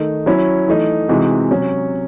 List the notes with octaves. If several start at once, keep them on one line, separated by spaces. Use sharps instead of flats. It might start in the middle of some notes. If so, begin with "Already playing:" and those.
Already playing: D#3 A3 D#4
F#3 C#4 E4
E3 A3 D#4
C3 E3 G#3 D#4 F#4
C3 F#3 C#4 F#4